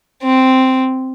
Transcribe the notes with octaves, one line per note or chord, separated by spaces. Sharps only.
C4